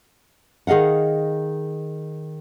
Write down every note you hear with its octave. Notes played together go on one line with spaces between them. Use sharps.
D#3 G#4 D#5 F5 F#5